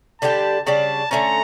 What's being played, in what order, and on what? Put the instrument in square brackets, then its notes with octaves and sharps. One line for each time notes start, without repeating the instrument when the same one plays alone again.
[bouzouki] D3 G3 D4 G4 [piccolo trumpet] A5
[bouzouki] C#3 G3 D4 [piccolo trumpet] A5
[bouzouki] D3 A3 C#4 [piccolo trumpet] A#5